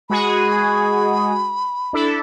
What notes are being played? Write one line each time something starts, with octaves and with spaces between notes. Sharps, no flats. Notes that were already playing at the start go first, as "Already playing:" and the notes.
G#3 F#4 G#4 B5
D4 E4 A4